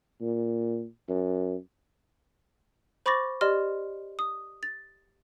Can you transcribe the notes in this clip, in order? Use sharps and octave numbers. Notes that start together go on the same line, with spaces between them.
A#2
F#2
C5 B5 C#6 D6 A6 A#6
G4 D5 D#5 C6 F6
D#6
A6